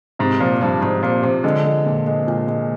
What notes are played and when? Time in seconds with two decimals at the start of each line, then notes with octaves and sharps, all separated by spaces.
0.19 G#2 C3
0.40 A#2 F3
0.61 G2 F3
0.82 G#2 F3
1.03 A#2 F3
1.23 C3 F3
1.44 D3 G#3
1.65 G#3
1.86 A#2
2.07 G#3
2.28 A#2
2.48 G#3